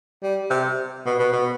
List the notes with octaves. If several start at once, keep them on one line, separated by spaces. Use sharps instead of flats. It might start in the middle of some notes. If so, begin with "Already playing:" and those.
G3
C3
B2
B2
B2